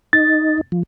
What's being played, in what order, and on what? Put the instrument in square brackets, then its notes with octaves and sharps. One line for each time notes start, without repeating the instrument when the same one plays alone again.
[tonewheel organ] D#4 [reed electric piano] A6
[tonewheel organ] F3